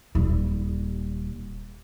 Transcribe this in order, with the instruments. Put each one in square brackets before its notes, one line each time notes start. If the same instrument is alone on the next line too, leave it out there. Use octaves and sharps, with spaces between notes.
[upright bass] D#1 G3